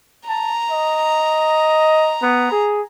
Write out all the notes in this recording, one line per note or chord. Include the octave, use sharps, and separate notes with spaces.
A5 A#5
D#5
B3
G#4